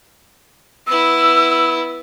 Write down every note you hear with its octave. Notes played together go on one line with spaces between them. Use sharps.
B3 E4 E6